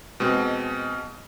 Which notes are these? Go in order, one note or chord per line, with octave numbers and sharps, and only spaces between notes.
B2 G#3 C4